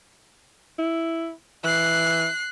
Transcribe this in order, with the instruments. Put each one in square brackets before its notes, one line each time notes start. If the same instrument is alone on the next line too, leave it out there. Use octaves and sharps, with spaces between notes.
[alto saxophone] E4
[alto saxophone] E3 [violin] F#6 C7